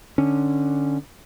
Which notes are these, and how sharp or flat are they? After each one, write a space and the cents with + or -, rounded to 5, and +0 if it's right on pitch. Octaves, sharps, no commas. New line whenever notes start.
D3 +15 C#4 +0